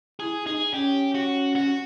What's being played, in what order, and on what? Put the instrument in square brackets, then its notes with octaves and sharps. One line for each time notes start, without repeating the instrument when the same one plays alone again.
[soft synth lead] E4 [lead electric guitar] G#4
[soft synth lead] D#4 [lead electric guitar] G#4
[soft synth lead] C#4 [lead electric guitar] G4
[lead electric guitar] F#4
F#4